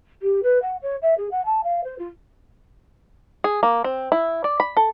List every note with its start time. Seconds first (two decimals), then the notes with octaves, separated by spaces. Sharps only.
0.22 G4
0.42 B4
0.62 F#5
0.81 C#5
1.02 E5
1.17 G#4
1.31 F#5
1.45 A5
1.63 F5
1.84 C5
1.98 F4
3.44 G#4
3.63 A#3
3.84 C4
4.12 E4
4.44 D5
4.60 B5
4.77 A4